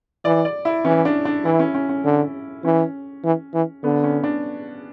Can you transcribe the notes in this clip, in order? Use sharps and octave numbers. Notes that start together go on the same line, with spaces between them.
E3 D5
D5
E4
E3 C#4
D4
D4
E3 E4
C#4
C#4
C#4
D3
E3 C#4
E3
E3
D3 B3
C#4
D4